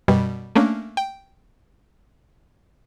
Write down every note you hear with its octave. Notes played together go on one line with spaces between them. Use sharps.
F#2 B2 G3
A3 A#3 C#4 D4
G5